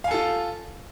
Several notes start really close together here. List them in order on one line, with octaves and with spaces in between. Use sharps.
F5 G#5 A4 F4